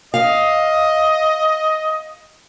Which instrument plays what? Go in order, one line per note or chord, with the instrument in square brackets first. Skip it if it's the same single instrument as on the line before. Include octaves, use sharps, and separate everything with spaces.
[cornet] D#5 [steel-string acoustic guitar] F5